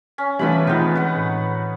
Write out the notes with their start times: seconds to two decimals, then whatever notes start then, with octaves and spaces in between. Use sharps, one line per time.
0.18 C#4
0.39 E3 F3 G3 A3 C#4 B4 B5
0.67 D#3 G#3 B3 C4 D#4 F4
0.95 B4 F#5
1.16 A2